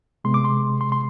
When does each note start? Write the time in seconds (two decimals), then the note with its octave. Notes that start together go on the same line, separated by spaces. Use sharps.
0.24 C3 G#3 B3 C6
0.34 D6
0.44 C6
0.81 C6
0.92 C6